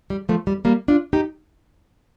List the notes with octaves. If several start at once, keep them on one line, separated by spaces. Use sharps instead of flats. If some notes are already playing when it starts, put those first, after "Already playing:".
G3
F3 A3
G3
G3 A#3
D4 F4
D#4 G4